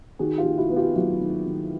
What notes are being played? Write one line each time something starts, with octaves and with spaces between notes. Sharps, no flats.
D#3 F#4 G#4
F4 G4
D#3
E4 F#4
B3
F4 G4
F#3 E4 F#4
D#3
D#3